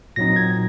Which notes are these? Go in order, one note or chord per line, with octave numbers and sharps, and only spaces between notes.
A#2 F#3 C4 D#4 A#6
G#6